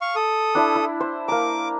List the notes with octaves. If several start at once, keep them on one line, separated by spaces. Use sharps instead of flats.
F5 C#6
A4 D#6
D4 E4 E6
E4
C5
A#3 A#5 D6